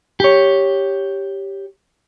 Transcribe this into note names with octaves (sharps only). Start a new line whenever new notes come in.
G4 C#5